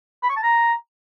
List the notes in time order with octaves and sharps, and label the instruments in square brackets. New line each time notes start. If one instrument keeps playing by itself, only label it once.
[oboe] B5
C#6
A5
A#5